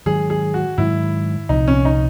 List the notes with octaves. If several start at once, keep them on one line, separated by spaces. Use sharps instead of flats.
G#2 D#3 F#3 G#4
G#4
F#4
G#2 D#3 F#3 E4
C2 A#2 F3 D#4
C#4
D#4